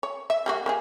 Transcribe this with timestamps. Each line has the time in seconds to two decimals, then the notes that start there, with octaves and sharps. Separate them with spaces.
0.03 C#5
0.30 E5
0.46 G3 A#3 F#4
0.66 A#3 G4 G#4